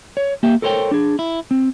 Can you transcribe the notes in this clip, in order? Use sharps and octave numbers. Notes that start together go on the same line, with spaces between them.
C#5
A#3 G4 E5 G5
A4 A#4 C5 C#5 G5
D4 G#4
E4
C4